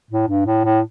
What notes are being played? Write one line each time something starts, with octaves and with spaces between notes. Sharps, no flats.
A2
G2
A2
A2